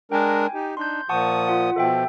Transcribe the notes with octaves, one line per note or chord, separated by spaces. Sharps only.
G#3 D4 A#4 G5 G#5
D#4 G4
D4 D#4 C6 G6
A#2 F3 F#5 A5 C#6 D#6
F4 F#5
B2 F3 A4 E5 G5